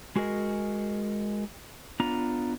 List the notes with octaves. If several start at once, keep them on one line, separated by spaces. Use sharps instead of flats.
G#3 F#4 G#4 A#4 D#5
B3 D4 F4 A#5